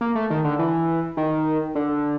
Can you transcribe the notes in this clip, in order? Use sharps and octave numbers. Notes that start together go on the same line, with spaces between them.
A#3
A3
D#3
D3
E3
D#3
D3